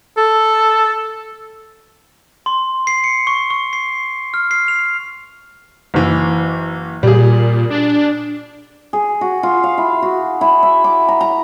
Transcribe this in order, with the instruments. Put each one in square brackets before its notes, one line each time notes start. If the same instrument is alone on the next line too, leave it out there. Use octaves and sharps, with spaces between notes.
[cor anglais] A4
[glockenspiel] C6
C7
C#7
C#6
C#6
C7
F6
C7
F7
[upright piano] F#1 E3
[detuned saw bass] A#2 [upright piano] G3 G#4
[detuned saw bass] D4
[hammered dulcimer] G#4
F#4
F4
F5
E4
F#4
E4
E5
D6
A#5
A#5